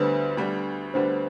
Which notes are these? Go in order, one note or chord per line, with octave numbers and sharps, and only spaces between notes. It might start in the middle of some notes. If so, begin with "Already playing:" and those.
Already playing: D2 D3 G3 B3 B4 C5
D2 D3 G3 B3
D2 D3 G3 B3 C5